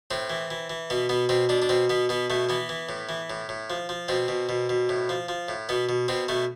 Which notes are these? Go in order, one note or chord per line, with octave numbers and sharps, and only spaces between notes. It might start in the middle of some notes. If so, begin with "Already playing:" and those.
A2 C4
E3
E3
E3
B2 B3
B2 B3
B2 C4
B2 D4
D4
B2 C4
B2 B3
B2 B3
B2 A3
E3 B3
E3
A2
E3
A2
A2
F3
F3
B2 C4
B2
B2
B2
A2
F3
F3
A2
B2 B3
B2
B2 C4
B2 A3